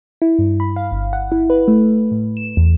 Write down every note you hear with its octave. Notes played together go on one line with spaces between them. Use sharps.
E4
G2
B5
F5
G1
F#5
E4
B4
A3
A2
E7
E2